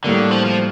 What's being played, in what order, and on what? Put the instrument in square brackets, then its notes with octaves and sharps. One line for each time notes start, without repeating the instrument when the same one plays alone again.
[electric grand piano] A2 G3 A#3 [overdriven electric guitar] D3
[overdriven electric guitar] F3
F3